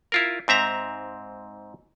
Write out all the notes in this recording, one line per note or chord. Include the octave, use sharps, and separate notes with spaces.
E4 F4 A#4
G#2 C4 E5 A#5